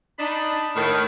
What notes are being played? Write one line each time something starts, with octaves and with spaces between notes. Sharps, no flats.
D4 D#4 B5
A2 D#3